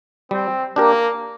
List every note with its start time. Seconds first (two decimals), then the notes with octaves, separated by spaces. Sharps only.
0.31 G3 C4
0.76 A#3 D4 G4 A#4